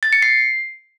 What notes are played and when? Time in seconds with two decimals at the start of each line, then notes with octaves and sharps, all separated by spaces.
0.03 A6
0.13 C#7
0.22 C7